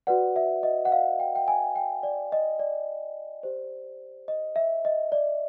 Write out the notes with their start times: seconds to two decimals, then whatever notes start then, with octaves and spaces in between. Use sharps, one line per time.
0.07 F#4 B4 D5 F#5
0.36 E5
0.63 D#5
0.85 F#5
0.92 F5
1.20 G5
1.35 G5
1.48 G#5
1.76 G5
2.03 D5
2.32 D#5
2.60 D5
3.43 G4 C5
4.28 D#5
4.56 E5
4.85 D#5
5.12 D5